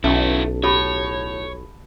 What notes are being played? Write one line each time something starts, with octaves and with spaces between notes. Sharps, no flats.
B1 A3 C#4 E4 F#4
A2 G4 C#5